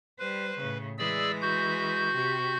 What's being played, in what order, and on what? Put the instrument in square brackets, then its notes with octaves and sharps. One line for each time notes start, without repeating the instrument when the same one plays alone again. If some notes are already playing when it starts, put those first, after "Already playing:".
[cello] G3 C5 [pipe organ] B4
[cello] A2 C#3
[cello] E3 G#3 [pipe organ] G#4 D5 E6
[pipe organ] F#4 G6
[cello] C3 G4